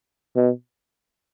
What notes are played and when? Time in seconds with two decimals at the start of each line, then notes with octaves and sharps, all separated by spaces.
0.36 B2